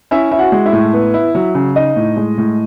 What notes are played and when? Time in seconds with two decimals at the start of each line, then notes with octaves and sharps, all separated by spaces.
0.11 C#4 E4 E5
0.31 E4 E5
0.39 F#4 F#5
0.52 G#3
0.66 E4 E5
0.73 A2
0.93 B3
1.14 E4
1.35 F#3
1.55 C#3
1.76 D#4 D#5
1.96 A2
2.16 G#3
2.38 A2